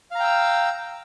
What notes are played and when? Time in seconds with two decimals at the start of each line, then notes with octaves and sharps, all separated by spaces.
0.11 F5
0.15 A#5
0.20 G5
0.24 E6